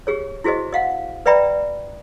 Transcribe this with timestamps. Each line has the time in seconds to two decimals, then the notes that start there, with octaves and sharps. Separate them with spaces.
0.07 G4 G#4 C#5
0.44 E4 F#4 G#4 C5 D#5
0.72 D#5 F5 F#5
1.26 B4 D5 E5 G5 A#5 B5